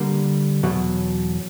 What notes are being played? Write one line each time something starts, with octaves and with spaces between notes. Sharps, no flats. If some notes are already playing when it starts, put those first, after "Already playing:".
Already playing: D3 G3 A#3
E2 B2 F#3